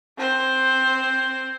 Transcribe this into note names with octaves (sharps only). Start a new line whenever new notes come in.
C4 C5